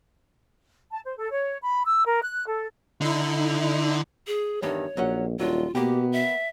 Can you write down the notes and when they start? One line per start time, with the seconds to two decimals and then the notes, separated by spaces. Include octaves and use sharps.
0.91 A5
1.06 C5
1.18 A4
1.32 C#5
1.63 B5
1.85 E6
2.07 A#4
2.23 F#6
2.48 A4
3.01 D3 D#4 E4
4.27 G#4
4.62 E2 G2 D#3 C#5
4.97 A#1 F#3 C#4 F#5
5.39 D#1 F#3 D4 F4
5.75 B2 A#3 B3 G4 G5
6.12 E5